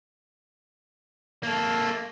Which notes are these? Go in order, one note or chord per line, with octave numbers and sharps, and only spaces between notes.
A#3 A4